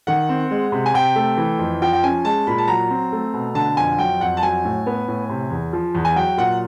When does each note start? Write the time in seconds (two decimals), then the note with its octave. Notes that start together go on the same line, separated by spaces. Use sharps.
0.07 D#3 F#5
0.29 C4
0.51 G#3
0.72 C3
0.86 G#5
0.94 C3 G5
1.16 A3
1.37 E3
1.59 F2
1.82 F3 G5
1.93 G5
2.03 C#4 G#5
2.25 G#3 A5
2.47 A#2 B5
2.58 A5
2.68 F#3 A#5
2.90 C4
3.12 A3
3.34 B2
3.55 D3 A5
3.77 F2 G#5
3.99 F#3 G5
4.21 F2 F#5
4.37 A5
4.43 F#3 G#5
4.65 A2
4.86 B3
5.08 A2
5.29 C3
5.50 E2
5.73 F3
5.95 E2
6.05 G#5
6.16 F#3 G5
6.37 A#2 F#5